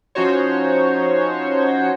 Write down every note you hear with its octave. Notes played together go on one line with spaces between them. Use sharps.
F3 C#4 D#4 F#4 C5 C#5